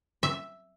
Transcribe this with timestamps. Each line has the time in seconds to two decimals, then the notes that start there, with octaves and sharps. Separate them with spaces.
0.23 E5